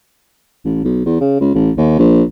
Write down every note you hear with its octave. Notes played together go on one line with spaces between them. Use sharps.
A1
B1
E2
C#3
C#2
A1
D#2
A#1